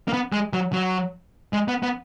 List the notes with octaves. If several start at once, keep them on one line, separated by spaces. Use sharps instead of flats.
A#3
B3
G#3
F#3
F#3
G#3
B3
B3